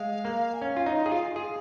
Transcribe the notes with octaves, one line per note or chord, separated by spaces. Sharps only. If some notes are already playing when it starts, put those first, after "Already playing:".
Already playing: G#3 F5
A#3
G#5
C#4 F5
F4
D#4
G#4
F4
G#4 F5